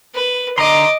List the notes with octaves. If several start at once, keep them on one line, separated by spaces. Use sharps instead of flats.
B4
D3 D#5 A#5 C6 D6